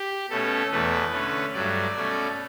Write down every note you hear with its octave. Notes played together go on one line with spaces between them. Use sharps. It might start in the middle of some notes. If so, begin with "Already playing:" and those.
Already playing: G4
B2 A3 C#4 A4
E2 B2 A3 B4
D3 A3 C#4
G2 F#3 A3 D5
B2 A3 C#4